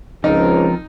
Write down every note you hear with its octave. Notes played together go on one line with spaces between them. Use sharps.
C#2 F3 C4 D#4 A#4